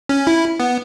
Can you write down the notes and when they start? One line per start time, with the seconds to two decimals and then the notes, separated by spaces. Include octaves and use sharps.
0.09 C#4
0.27 E4
0.60 B3